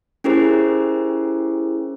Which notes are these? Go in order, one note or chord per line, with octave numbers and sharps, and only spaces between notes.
C#4 E4 G4 G#4 A#4 C5